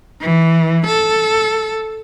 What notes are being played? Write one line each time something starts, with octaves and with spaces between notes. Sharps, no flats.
E3
A4